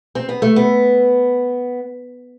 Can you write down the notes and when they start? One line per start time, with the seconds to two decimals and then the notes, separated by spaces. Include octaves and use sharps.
0.15 C4
0.29 B3
0.42 A3
0.56 B3